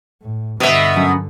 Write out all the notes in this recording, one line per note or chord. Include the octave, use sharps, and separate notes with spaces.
A2
G2 B2 D3 B3 D#5 E5
F#2